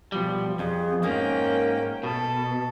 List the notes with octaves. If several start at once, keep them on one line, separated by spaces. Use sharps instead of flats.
B2 F3 G3
F2 G#4
G#2 A#3 C#4 A#4 G5
B2 A4